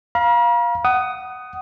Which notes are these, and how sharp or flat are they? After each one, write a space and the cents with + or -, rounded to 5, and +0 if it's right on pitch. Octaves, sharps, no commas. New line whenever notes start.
F5 +0 A#5 +45
F#5 +20 D#6 +0